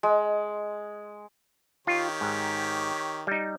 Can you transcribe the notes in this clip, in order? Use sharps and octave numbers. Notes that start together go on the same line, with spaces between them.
G#3
D#3 F4 G4 C#5
G#2
G3 D#4